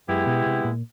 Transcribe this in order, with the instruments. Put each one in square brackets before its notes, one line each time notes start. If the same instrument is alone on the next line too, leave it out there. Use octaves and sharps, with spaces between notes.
[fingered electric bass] F#2 [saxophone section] G#3 B3 E4 G4
[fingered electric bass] B2
C3
A#2